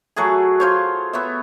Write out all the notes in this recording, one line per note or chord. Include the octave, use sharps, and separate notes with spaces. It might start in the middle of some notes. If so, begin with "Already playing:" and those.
F#3 A3 F#4 G#4
F4 C5 C#5
B3 C#5 E5